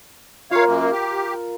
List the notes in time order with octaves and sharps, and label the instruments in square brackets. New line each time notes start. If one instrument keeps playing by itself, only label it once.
[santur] F4 A#4 [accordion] C#5 F5
[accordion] F#2 A#3
G4